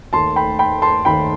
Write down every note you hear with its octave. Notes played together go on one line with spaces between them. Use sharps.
D#2 D#3 A3 A5 C6
G5 B5
G5 B5
A5 C6
D#2 D#3 A3 G5 B5